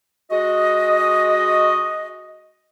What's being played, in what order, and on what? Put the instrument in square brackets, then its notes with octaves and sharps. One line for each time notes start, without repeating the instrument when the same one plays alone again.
[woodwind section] G#3 F#4 D#5